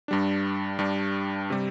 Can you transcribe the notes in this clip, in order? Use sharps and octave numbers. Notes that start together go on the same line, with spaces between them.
G2 G3 D4
G2 G3 D4
C3 G3